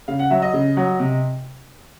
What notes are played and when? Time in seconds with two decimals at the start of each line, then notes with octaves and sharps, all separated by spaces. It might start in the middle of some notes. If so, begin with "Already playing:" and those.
0.08 C#3 F5
0.19 F#5
0.30 F#3 E5
0.42 D#5
0.54 C#3
0.77 F#3
1.00 C3